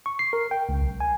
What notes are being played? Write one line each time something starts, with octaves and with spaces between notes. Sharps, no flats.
C#6
C7
A#4
G5
C#2
B1
G#5